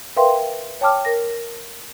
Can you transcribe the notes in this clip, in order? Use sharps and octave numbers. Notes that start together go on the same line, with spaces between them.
A#4 B4 E5 F5 G5 C6
C#5 G5 A5 D6 F6
A#4 A#6